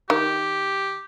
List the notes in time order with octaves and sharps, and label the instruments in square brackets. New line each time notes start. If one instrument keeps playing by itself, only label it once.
[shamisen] D#3 [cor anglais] G4